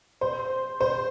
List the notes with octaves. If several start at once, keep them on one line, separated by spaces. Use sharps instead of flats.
C5
C5